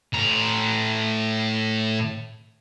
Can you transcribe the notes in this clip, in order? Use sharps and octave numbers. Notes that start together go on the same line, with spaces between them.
A2 A#5